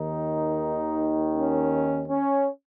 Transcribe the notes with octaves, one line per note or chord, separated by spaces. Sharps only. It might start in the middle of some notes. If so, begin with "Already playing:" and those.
Already playing: D#2 D#3 D#4
C#4
C#4